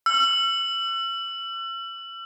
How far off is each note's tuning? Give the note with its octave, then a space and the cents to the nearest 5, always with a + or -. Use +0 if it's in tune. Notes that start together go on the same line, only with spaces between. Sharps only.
E6 +40